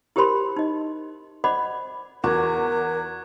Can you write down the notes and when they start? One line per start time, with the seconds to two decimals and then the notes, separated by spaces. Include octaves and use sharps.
0.16 E4 G4 A#4 C5 B5 C6
0.57 D#4 D#5
1.44 C5 D5 D#5 F#5 B5 D6
2.24 E2 F#4 A#4 D6 G#6